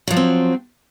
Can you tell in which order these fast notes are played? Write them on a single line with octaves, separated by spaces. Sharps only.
F#3 F3 F#4 C4